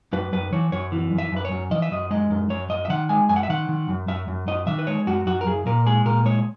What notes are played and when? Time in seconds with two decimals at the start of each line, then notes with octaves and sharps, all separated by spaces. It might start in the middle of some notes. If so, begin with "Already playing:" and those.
0.13 F#2 B4
0.33 F#2 B4
0.53 E3 C#5
0.72 F#2 C#5
0.92 E3
1.12 F#2
1.18 E5
1.32 F#2 B4
1.45 C#5
1.51 F#2
1.71 E3 D#5
1.82 E5
1.91 F#2 D#5
2.11 G#3 D#5
2.31 F#2
2.50 F#2 C#5
2.70 F#2 D#5
2.85 E5
2.90 D#3 F#5
3.09 G#3 G#5
3.29 F#2 G#5
3.36 F#5
3.43 E5
3.49 D#3 F#5
3.69 D#3
3.89 F#2
4.08 F#2 E5
4.28 F#2
4.47 F#2 D#5
4.67 D#3 E5
4.79 B4
4.87 G#3 C#5
5.07 F#2 F#4
5.27 F#2 F#4
5.41 A#4
5.46 F#2 G#4
5.66 A#2 A#4
5.86 G#3 G#4
6.06 A#2 A#4
6.26 G#3 C#5